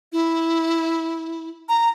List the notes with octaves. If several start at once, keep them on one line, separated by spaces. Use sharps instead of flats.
E4
A#5